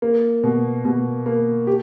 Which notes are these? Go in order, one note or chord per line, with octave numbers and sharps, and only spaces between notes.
A#3
B2
B2
A#3
G4